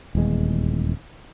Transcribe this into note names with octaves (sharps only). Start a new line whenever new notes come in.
D#1 E2 G#3